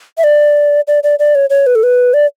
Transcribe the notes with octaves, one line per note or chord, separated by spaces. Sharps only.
E5
D5
D5
D5
D5
C#5
C#5
B4
A4
B4
D5